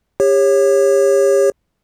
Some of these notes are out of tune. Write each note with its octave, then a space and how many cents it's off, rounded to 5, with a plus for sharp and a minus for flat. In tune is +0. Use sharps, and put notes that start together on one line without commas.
G4 +35 C#5 -15